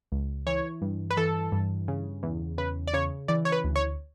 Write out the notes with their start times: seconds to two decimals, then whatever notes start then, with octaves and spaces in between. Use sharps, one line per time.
0.12 C#2
0.47 E3 C#5
0.82 G2
1.11 B4
1.17 E3 A4
1.52 G2
1.88 C#3
2.23 E2
2.58 C#3 B4
2.87 D5
2.94 C#3 C#5
3.28 E3 D5
3.45 C#5
3.52 B4
3.64 D2
3.76 C#5